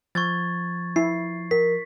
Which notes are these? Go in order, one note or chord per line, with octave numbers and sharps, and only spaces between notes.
F3 C#6 G#6 A6
E4 C7
A#4 B6